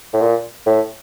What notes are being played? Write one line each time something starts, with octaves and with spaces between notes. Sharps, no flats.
A2
A#2
A2